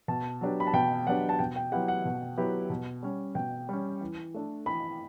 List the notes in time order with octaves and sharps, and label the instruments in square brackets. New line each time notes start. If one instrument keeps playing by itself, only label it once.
[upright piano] B2 [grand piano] A5
[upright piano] F#3 B3 D4 G4
[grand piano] B5
A5
[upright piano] B2 [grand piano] G5
[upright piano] F#3 B3 D4 G4 [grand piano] F#5
[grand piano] A5
[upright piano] B2 [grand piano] G5
[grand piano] G5
[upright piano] F#3 B3 E4 G4 [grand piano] F#5
[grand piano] F#5
[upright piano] B2
F#3 B3 E4 G4
B2
G3 C#4
[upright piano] B2 [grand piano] G5
[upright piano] G3 C#4
E3
A3 D4 A4
[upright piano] E3 [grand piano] B5